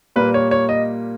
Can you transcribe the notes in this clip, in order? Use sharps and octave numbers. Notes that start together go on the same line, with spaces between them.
A#2 G3 A#3 B4
C#5
C#5
D#5